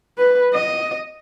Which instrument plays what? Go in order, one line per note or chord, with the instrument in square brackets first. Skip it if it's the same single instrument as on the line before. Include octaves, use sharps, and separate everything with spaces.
[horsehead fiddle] B4
D#5